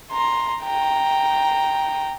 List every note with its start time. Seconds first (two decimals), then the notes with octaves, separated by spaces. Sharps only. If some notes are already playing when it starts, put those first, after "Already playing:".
0.11 A#5 C6
0.64 G5 A#5